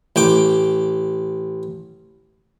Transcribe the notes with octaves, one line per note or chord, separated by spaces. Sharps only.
A1 G5 D6